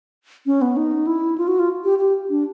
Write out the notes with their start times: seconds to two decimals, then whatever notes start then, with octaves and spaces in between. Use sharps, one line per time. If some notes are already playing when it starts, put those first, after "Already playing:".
0.46 C#4
0.62 B3
0.77 D#4
1.07 E4
1.38 F4
1.48 F#4
1.59 F4
1.84 G4
1.99 G4
2.30 D4